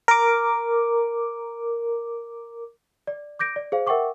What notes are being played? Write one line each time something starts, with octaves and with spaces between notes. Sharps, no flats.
A#4 D6
D5
D6 G6 A#6 D7
D5
G#4 C5 F5
A#4 E5 F#5 G5 C#6 D6